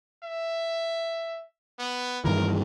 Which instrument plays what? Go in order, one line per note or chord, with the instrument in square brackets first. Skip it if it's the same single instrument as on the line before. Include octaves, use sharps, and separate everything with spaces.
[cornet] E5
B3
[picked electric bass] G2 D#3 E3 [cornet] A#4